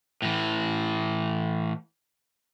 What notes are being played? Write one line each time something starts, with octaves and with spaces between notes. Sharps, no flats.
A2 E3